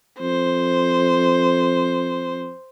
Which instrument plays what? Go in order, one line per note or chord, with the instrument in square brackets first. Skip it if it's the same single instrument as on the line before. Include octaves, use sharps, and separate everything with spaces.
[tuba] F2 [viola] C5